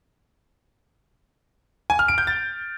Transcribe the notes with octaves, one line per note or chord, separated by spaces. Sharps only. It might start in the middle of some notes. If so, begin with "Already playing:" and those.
G#5
F6
D7
G6
A6